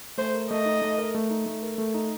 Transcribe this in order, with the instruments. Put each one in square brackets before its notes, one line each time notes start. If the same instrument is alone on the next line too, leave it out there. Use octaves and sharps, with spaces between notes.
[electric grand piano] A3 [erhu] C5
[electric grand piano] A#4
[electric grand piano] A3 [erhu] D#5
[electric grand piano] D#4
A3
A#4
A3
D#4
A3
A#4
A3
D#4